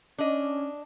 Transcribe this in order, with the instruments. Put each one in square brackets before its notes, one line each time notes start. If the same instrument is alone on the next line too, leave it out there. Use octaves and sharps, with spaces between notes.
[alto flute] C#4 [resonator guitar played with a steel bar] D4 D#5